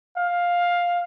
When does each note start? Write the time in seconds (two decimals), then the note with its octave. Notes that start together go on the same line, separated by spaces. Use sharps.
0.18 F5